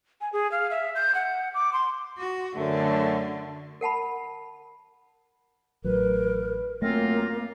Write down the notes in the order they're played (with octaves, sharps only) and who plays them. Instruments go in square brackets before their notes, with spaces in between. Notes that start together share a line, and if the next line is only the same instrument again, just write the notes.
[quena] G#5
G#4
F5
E5
G6
F#5
D6
C6
[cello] F#4
[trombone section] F#2 A3 [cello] D3
[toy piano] A#4 F#5 A5 B5
[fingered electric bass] A1 F#3 [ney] A#4 [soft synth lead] B4
[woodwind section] F#2 C4 F4 [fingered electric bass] A3 [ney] A#3 [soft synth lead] A#6